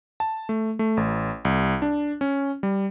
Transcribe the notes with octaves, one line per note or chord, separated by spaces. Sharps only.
A5
A3
A3
A1
C2
D4
C#4
G3